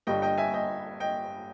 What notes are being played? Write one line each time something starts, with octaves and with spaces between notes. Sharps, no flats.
G1 G2 G3 D#5 G5
D#5 G5
E5 G#5
D#5 G5
D#5 G5